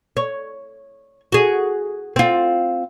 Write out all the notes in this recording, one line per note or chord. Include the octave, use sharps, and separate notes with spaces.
C#5
F#4 G#4
C4 F4